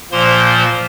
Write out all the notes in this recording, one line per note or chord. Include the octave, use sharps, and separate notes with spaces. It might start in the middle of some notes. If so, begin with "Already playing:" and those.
A#2 F3 A#3 C5 C6